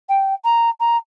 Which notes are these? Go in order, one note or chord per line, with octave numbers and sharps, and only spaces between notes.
G5
A#5
A#5